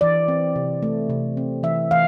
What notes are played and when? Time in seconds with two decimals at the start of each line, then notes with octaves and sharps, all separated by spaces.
0.01 E3 D5
0.28 C4
0.56 C3
0.83 A3
1.10 C3
1.37 C4
1.63 E3 E5
1.91 E3 F5